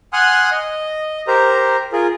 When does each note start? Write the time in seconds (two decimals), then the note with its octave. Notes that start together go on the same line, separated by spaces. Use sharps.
0.13 F#5 G#5 C6 D#6 F6 F#6
0.52 D#5
1.28 G4 A#4 C5 A#5
1.93 F4 G#4 A#4